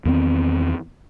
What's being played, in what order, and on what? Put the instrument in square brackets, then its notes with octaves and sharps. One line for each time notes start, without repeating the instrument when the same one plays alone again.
[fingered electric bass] E2 D#3 A#3 C4